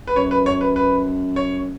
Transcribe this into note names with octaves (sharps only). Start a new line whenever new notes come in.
B4
F#2 C#5
B4
C#5
B4
B4
C#5